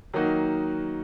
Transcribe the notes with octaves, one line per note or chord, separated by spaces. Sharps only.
D#3 F#3 A#3 D#4 F#4